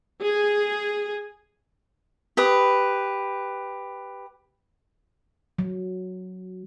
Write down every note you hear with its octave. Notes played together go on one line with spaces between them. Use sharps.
G#4
G4 B4 D#6
F#3